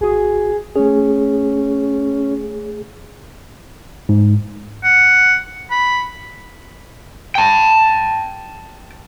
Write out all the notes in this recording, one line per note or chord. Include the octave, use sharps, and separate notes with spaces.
G#1 F#4 G#4
A3 C#4 G#4
G#2
F#5
B5
G5 A5